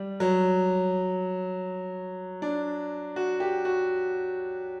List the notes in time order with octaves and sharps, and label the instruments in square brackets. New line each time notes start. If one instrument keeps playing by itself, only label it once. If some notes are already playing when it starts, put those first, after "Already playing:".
Already playing: [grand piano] G3
F#3
D4
F#4
G4
F#4